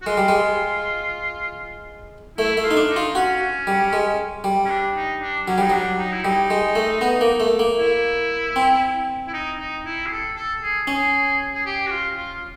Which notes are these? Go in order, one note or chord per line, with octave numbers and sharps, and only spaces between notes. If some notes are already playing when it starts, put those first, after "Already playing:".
F#4
G#3 F4
G3
G#3
A3 E4
A3
F4
D#4
D4
D#4
F4
C#4 F#4
G3
G#3
G3
C#4
D4
D#4
D4
F#3 C#4
G3 D#4
F#3 D4
D#4
E4
G3 D#4
G#3
A3
B3
A#3
A3
A#3
E4
C4
E4
D#4
D#4
E4
G#4
A4
A4
G#4
C#4 G#4
G#4
G4
F#4
F4
F4